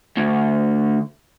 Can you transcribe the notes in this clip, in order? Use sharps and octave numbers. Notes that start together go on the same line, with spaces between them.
D2